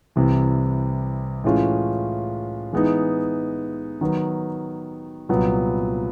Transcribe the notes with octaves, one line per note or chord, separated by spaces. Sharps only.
C2 C3 E3
A2 E3 G#3 C#4 F4
E3 G#3 B3 D#4
D#3 F#3 B3
C2 A#2 F#3 B3